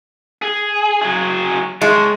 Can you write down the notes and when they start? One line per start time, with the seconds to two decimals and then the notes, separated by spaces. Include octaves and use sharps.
0.42 G#4
1.02 F#3 G#4
1.81 G#3 C#5 A5